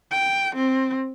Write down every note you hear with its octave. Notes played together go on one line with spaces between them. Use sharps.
G5
C4